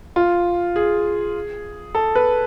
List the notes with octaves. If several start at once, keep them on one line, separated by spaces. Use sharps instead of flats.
F4
G#4
A4
B4